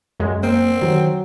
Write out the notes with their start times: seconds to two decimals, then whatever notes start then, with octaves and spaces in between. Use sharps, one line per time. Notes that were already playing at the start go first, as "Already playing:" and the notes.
0.20 F#2 G#3
0.43 A#3 C4
0.82 D#3 F#3